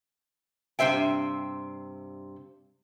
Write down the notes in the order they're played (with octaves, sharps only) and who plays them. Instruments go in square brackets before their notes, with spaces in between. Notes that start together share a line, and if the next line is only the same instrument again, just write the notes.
[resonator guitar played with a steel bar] G2 C3 C5 E5 G5